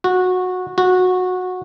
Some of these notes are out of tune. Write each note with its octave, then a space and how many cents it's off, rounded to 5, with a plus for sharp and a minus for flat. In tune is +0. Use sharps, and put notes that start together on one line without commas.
F#4 -15
F#4 -15